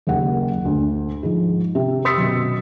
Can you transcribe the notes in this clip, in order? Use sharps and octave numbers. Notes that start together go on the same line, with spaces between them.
F#1 D#2 F#5
D2
G#2 F3
C3
C6 D#6 E6 A6 B6 C#7
F#2 B2